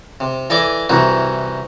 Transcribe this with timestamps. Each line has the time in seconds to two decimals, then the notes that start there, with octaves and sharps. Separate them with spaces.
0.20 C3
0.50 E3 A4 D5 D#5 G#5 D6
0.89 C2 C3 E3 D#4 E4 F#4